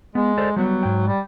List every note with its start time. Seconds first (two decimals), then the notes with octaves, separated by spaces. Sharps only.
0.15 G#3 B3
0.38 A4 C5 D5
0.56 F#3 G3 B3
0.83 G#2 G5
1.07 G3